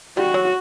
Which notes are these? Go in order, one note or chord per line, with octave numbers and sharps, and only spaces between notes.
G3 F#4
F#3